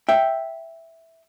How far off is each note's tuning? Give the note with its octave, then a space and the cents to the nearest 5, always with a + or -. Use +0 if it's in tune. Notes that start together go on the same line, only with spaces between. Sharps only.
E5 +0 G5 +0